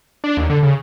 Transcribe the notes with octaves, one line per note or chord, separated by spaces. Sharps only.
D4
D#2
D3
C#3